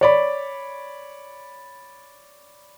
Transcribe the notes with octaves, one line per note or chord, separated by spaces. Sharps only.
C#5 D5 B5